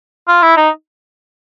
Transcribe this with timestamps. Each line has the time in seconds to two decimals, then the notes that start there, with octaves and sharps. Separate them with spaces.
0.28 F4
0.42 E4
0.57 D#4